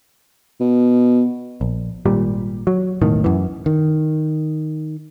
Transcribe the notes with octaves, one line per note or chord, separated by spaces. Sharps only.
B2
A#1
G#1 A#2 G3
F#3
E1 B1 A2 D#3
F#2 E3
D#3